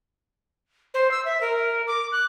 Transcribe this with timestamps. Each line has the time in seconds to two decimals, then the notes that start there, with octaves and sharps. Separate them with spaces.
0.94 C5
1.11 E6
1.25 E5
1.41 A#4
1.87 D6
2.12 F#6